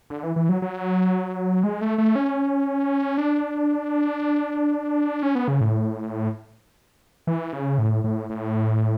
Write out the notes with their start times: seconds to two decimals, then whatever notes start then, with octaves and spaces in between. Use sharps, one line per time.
0.10 D3
0.23 E3
0.36 E3
0.49 F#3
0.62 F#3
1.64 G#3
1.81 A3
1.98 A3
2.16 C#4
3.18 D4
5.23 C#4
5.35 B3
5.48 C#3
5.61 A2
7.27 E3
7.53 C#3
7.78 A2
8.04 A2
8.30 A2